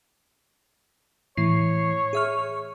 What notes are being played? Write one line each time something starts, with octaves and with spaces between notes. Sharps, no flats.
A2 E3 C#5 C7
G#4 E5 F6